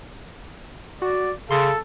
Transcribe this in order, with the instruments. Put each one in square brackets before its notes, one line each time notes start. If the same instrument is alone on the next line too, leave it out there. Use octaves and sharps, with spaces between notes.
[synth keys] F#4 [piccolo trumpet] D5
[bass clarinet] C#3 [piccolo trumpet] A4 [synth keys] C6